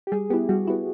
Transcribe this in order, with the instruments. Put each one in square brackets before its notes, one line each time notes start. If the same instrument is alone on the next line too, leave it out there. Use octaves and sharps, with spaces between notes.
[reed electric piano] G4
[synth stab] G3 [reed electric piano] G#4
[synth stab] B3 E4 [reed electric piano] G4
[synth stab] G3 [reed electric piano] F#4
[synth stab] B3 E4